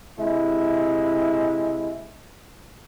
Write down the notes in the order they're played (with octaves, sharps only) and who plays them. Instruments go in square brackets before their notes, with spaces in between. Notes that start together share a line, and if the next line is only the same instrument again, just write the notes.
[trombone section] C3 G#3 E4